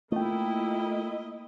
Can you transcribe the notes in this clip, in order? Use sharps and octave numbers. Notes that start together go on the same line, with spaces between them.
A3 A#3 E4 F4 D#5 G5